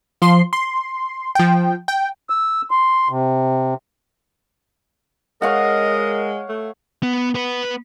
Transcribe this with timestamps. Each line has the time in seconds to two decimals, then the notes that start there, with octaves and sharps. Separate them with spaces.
0.22 F3 C6
0.53 C6
1.35 F3 G5
1.88 G5
2.30 E6
2.71 C6
3.09 C3
5.42 G#3 A#4 C#5 D#5 F5 F#5
6.49 A3
7.03 B3
7.35 B3 B4